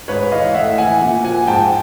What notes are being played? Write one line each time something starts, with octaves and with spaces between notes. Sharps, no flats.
G#2 B4 C#5
E3 D#5 F5
A2 E5 F#5
E3 F#5 G#5
A#2
F3 F#5 G#5
G#2 G5 A5